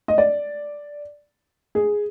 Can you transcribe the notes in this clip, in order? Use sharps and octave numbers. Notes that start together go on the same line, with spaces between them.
D#5
D5
G#4